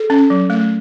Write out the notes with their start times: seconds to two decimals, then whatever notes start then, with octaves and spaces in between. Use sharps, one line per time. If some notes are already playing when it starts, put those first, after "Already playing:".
Already playing: A4
0.10 C#4
0.30 F#3
0.50 A3